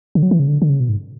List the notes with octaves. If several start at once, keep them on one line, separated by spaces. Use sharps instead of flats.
D3
F#3
E3
C#3
D3
D3
C#3
B2
G#2